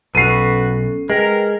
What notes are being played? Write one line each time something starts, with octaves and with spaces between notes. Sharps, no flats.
B1 C#4 F#4 A4 B4 C7 D#7
G#3 A#4 B4 G5